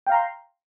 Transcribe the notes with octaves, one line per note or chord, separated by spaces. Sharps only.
F5 G5 A#5 C6